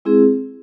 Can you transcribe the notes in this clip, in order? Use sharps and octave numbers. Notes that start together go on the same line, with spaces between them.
G#3 C4 E4 G#4